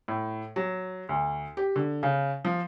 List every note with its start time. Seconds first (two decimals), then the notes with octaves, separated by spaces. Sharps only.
0.08 A2
0.56 F#3
1.09 D2
1.57 G4
1.76 D3
2.03 C#3
2.45 F3